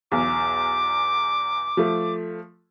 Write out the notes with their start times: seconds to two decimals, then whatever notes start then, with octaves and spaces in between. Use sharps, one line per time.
0.12 B1 E2 D6
1.77 F3 A3